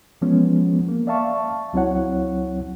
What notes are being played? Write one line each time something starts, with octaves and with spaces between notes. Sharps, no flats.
E3 F3 G#3 B3 C#4
A#3
D5 E5 F5 A5 C#6
C#2 F#3 C4 E4 C#5 F#5